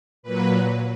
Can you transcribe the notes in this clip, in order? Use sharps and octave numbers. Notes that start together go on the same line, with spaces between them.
A#2 F#3 B4